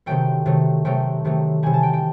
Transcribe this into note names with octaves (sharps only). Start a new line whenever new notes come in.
C3 D#3 F#3 A3 G5
C3 D#3 F#3 A3
C3 D#3 F#3 A3 G5
C3 D#3 F#3 A3
C3 E3 G3 G#5
A5
G5
G5